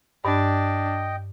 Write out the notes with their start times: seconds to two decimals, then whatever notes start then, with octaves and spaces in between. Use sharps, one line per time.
0.25 G2 D4 D#5 G5